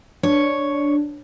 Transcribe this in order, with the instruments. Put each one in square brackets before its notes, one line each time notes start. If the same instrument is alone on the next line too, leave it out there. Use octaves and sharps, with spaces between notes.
[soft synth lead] D4 [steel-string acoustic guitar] C#5